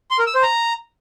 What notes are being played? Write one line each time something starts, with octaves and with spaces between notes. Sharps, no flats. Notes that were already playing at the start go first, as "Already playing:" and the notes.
C6
A#4
E6
C5
A#5